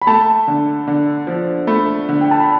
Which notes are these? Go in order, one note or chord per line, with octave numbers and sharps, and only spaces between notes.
B5
A3 A5
D3
D3
F3
A3 B5
D3
G5
A5
B5